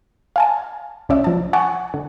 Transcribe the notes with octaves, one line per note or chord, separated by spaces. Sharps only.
F5 G#5 A5
C2 C#4 D5 E5
F3 A5
F#5 G#5 A5 C#6 D6
D3